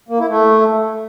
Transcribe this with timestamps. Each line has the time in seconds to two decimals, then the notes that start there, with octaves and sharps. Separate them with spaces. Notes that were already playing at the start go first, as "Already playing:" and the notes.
0.09 A#3
0.19 E4
0.29 A3